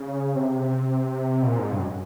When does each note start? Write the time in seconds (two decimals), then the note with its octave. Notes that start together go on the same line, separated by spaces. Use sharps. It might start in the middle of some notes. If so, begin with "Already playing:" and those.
Already playing: C#3
0.35 C3
1.42 B2
1.47 A#2
1.59 G#2
1.72 G2
1.79 F#2